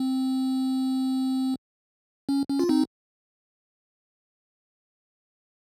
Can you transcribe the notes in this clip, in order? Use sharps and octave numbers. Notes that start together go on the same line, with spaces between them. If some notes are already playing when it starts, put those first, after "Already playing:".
Already playing: C4
C#4
C#4
F4
C4 D#4